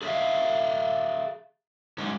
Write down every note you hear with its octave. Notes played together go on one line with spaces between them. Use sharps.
G#4 A4 D5 E5 F5
F#3 G#3 C#4 D#4